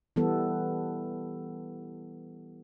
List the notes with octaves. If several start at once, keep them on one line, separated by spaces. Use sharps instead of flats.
E3 G3 B3 A4